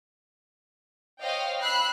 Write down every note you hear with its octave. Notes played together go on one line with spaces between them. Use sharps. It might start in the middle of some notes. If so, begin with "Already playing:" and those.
C5 C#5 D#5 F5 G5
B5 E6 F#6 C7